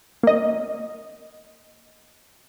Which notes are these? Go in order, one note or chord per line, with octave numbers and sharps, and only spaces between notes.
A#3 D#5